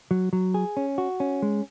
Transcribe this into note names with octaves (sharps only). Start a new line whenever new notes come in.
F#3
F#3
G#4
C#4
F#4
C#4
G#3